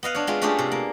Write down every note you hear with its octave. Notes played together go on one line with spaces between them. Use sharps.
B3 D#5 F5 F#5
D4 C#5
G#3 B3 C4 F4
A3 C#4 D4 F4 G4 G#4
C3
A#3